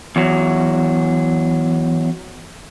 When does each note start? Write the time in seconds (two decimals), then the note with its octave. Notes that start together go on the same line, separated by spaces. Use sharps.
0.16 E2 F#3